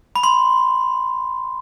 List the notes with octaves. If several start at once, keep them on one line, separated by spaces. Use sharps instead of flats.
B5
C6